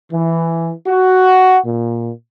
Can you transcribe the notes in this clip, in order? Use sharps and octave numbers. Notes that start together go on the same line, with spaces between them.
E3
F#4
A#2